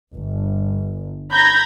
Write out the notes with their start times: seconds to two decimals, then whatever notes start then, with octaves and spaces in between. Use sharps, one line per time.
0.13 G1
1.33 A#5 B5 G6 G#6 A#6